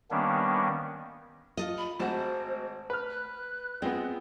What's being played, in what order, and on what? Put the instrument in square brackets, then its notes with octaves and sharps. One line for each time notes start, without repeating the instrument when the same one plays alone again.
[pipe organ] D#3 G3 A#3 B3 C#4 D4
[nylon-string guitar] F4 A4 D#5
[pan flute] B5
[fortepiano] G#1 F#4 [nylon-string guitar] A3 A5 [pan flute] C5
[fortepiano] B4 F6
[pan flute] F#6
[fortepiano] G#3 B3 [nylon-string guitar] C4 [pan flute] F4